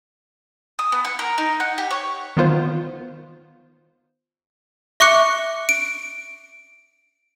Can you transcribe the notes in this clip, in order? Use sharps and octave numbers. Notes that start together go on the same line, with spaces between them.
D#6
B3
F#5
A#4
D#4
F#5
G4
C#5
D#3 B3 F4 C5
E5 C#6 D6 F#6 C#7
D7